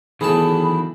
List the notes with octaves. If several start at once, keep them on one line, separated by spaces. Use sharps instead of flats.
D#3 E3 F#3 A3 B3 G#4 A5 B5